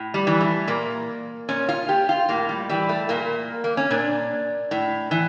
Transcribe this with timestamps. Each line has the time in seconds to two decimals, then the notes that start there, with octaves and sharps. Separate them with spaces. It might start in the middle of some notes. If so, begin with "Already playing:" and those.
Already playing: A2
0.14 G3
0.27 E3
0.40 A3
0.68 A#2 A#3
1.49 A#2 C#4
1.69 F4
1.89 G4
2.09 F4
2.29 A2 A#3
2.49 G3
2.69 E3 G3
2.89 A3
3.09 A#2 A#3
3.64 A#3
3.77 C#4
3.91 A#2 D4
4.71 A2
5.11 E3